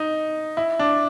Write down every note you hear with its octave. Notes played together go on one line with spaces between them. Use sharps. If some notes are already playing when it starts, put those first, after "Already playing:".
Already playing: D#4
E4
D4